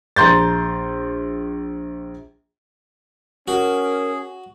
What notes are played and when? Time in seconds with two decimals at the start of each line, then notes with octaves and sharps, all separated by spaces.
0.16 A#1 A#5 C6 G6 A6
3.48 C#4 F#4 G#4 A#4